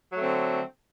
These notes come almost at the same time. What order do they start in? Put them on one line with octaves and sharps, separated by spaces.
F#3 A3 C4 D3